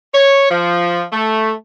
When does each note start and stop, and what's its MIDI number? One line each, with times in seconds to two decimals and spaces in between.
0.13 0.49 73
0.49 1.03 53
1.12 1.52 57